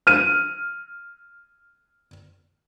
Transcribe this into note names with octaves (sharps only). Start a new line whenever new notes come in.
F6 D#7